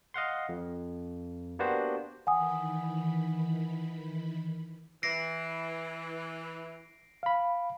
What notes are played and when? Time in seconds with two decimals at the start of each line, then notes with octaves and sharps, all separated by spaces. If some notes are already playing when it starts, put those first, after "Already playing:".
0.14 D#5 F5 F#5 C6
0.49 F2
1.59 A#3 B3 D4 F#4 G4 C5
2.27 D#3 E3 F#5 G#5 B5 D#6
5.03 E3 A#6 C7 D7
7.23 F5 B5